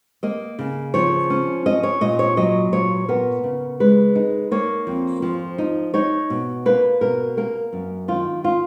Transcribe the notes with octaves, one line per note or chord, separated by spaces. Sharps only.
A#3 D#5
C#3
F3 C#5
C#4
C#4 D#5
C#5
A#2 D#5
C#5
F#3 D#5
A#2 C#5
B3 A#4
C#3
G#3 B4
D#4
A#3 C#5
F2
F3
D#4
D#4 C#5
B2
A#3 B4
B2 A#4
A#3 A#4
F#2
D#3 F4
F4